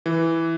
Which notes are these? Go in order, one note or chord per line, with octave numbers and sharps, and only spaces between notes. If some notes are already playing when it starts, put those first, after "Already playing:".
E3